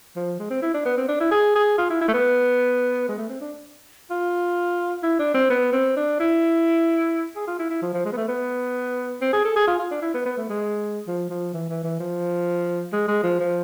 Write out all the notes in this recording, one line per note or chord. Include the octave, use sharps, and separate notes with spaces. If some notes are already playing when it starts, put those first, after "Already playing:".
F3
G#3
C4
E4
D4
B3
C4
D4
E4
G#4
G#4
F4
E4
E4
A3
B3
G#3
A3
C4
D4
F4
E4
D4
C4
B3
C4
D4
E4
G#4
F4
E4
E4
F3
F3
G#3
B3
A3
B3
C4
G#4
A4
G#4
F4
F4
D4
E4
B3
B3
A3
G#3
F3
F3
E3
E3
E3
F3
G#3
G#3
F3
F3